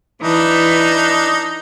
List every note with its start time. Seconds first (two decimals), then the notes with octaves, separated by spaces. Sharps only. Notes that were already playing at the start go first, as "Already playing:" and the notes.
0.22 E3 D4 D#4